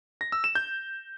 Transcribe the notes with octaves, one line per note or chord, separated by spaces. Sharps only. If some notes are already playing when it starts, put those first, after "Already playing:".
A#6
E6
E7
G6